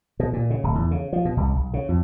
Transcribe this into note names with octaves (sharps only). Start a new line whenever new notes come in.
B2
A#2
C#3
D1
E2
C#3
F3
B2
C2
B1
C#3
F2